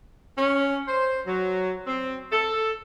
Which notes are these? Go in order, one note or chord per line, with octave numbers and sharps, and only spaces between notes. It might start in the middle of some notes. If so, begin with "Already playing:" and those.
C#4
C5
F#3
C4
A4